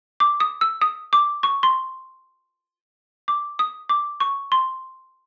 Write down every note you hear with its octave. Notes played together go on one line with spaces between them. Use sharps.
D6
D#6
E6
D#6
D6
C#6
C6
D6
D#6
D6
C#6
C6